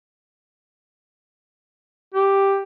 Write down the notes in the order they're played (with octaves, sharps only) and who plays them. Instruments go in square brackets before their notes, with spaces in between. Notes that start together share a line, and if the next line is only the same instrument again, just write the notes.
[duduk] G4